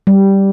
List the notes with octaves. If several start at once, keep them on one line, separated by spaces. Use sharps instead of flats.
G3